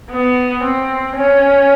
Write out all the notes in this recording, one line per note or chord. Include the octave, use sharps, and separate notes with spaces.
B3
C4
C#4